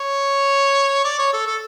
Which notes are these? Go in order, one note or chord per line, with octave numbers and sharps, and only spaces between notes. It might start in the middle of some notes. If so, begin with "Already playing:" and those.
Already playing: C#5
D5
C#5
A4
A4